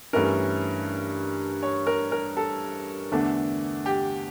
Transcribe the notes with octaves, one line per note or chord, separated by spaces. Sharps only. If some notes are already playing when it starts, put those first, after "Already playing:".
G2 E3 A3 C#4 A#4
C#5
A#4
A#4
A4
E2 D3 A3 D4
G4